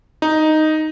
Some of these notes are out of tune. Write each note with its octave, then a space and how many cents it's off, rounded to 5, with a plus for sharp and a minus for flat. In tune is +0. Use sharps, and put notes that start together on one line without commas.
D#4 +0